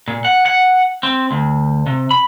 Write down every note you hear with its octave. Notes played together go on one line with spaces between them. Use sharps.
A#2
F#5
F#5
C4
D2
C3
B5